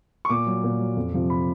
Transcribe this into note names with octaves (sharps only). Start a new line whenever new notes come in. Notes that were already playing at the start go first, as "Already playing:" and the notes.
C#6
A#2 D6
F#3
A#2
F#3
F2
C3 F3
B5